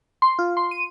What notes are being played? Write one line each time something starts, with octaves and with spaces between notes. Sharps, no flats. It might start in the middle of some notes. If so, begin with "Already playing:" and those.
C6
F4
C6
D#7